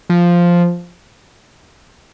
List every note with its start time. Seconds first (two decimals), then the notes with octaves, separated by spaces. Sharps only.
0.10 F3